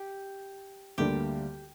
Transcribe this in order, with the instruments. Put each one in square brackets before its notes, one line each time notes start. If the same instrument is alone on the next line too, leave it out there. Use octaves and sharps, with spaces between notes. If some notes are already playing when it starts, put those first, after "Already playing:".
Already playing: [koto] G4
[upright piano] D2 D3 G3 A#3 D4 [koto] G4